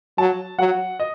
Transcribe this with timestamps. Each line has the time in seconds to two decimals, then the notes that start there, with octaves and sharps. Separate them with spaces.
0.18 F#3 A5
0.59 F#3 F#5
1.00 D#5